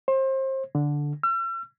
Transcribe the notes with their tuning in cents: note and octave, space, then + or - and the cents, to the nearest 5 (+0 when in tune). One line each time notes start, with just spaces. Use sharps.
C5 +30
D3 -5
E6 +45